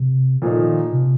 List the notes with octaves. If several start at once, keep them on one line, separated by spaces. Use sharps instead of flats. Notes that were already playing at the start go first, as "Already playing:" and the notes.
Already playing: C3
A#2 D#3 F3 A3 D#4
C3